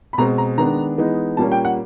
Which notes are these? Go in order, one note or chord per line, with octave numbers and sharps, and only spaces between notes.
B5
B2 G#3 C4 A#5
A#5
D#3 G#3 B3 D4 A#5
E3 G#3 B3 D#4
A#2 G3 A#3 C#4 A5
G5
F#5